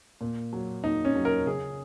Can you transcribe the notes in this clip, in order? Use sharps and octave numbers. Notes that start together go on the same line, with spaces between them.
A#2
F#3
A#2 D#4
C#4
F#3
A#4
C#3 G#4